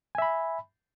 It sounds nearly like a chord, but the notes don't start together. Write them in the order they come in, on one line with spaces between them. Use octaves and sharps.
G#5 E5 B5